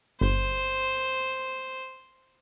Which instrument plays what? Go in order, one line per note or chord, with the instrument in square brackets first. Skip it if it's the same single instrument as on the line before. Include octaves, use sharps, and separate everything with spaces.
[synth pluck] G1 [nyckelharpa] C5